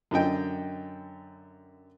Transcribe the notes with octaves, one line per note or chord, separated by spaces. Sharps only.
F#2 D3 D#5 G5